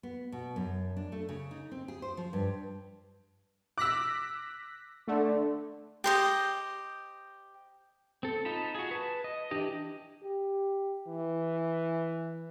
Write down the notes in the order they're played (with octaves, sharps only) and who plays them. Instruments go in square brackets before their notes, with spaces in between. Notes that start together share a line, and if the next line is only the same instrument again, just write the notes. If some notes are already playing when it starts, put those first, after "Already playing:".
[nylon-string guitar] B3
B2
F#2
D4
A3
C#3
D#4
C4
G#4
C5
F3
G2
[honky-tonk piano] D6 E6 [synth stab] F#6 A#6 B6
[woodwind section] D3 [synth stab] A3
[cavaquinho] G4 C5 D#5
[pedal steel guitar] C4 A4
D#4 F4 A5 B5
F#4 G#4
B4 A5
D#5
E3 D4 G4 D#5
[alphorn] G4
E3